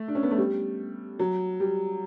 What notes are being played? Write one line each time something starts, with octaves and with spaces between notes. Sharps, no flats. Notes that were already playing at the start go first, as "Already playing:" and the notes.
Already playing: A3
D4
C#4
B3
A3
G3
F#3
G3